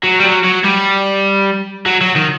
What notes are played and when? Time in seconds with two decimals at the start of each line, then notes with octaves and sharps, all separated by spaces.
0.04 F#3
0.20 G3
0.25 F#3
0.44 F#3
0.65 G3
1.86 F#3
2.01 F#3
2.16 D#3